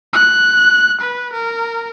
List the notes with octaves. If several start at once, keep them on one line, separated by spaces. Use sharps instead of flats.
F#6
B4
A#4